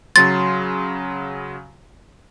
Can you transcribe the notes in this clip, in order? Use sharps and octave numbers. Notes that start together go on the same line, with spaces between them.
C#3 F#3 C6 A6